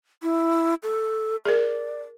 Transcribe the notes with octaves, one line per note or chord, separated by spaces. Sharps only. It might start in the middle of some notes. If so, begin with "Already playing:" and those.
E4
A4
G#4 A#4 D5